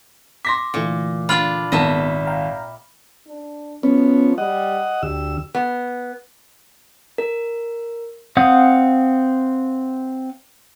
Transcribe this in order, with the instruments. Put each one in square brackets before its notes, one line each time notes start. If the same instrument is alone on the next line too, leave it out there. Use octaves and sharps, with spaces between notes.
[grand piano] C6 A#6 B6 [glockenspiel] D6
[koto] A#2 [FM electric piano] D3 E3 A3
[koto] D4 F4 [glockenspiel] B5 F6 F#7
[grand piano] G#1 A5 [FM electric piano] B3 A#4 [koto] D#5 E5
[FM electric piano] F5 G5 A#5
[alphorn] D4
[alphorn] F3 [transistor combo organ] B3 C#4
[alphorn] G3 [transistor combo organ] D#5 F#5
[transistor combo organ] D2 E6 [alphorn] G4
[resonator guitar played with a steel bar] B3
[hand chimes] A#4
[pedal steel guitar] C4 F5 F#5 D#6 G6